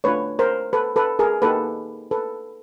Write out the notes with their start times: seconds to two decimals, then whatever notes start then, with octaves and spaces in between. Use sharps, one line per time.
0.04 A3 D4 F4 B4 C#5
0.39 A#4 C5
0.73 A4 B4
0.96 A4 B4
1.19 G#4 A#4
1.42 A#3 D#4 G4 A4 B4
2.11 A4 B4